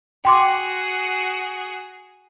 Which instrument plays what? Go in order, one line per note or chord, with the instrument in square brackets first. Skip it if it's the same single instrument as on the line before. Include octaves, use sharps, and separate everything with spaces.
[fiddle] F#4 G#4 [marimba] G5 C6 D6